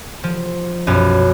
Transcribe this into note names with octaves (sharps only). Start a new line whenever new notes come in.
F3
B1 F#2